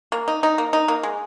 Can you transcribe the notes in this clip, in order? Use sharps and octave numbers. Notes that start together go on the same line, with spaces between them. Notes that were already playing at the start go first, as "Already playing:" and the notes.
A#3
D#4
D#4
A#3
D#4
A#3
G#3